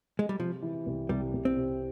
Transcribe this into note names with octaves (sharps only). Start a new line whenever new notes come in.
G#3
G3
C3 F3
E3
C2
C2 G3
C2
C4
C3